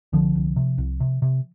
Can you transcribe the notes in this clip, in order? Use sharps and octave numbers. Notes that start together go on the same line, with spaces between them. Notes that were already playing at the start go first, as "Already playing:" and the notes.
C2 D3 F3
C2
C3
C2
C3
C3